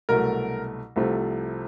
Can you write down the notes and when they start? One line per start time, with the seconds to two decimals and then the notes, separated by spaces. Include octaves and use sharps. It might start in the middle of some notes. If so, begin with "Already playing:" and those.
0.09 C2 B2 F#3 A3 A#4
0.96 C2 C3 F3 A3